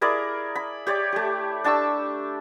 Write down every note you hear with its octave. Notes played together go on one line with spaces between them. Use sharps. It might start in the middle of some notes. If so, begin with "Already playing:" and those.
E4 G#4 A#4 D5
B5
G4 C#5 D5
A3 G4
D4 A5 C#6 E6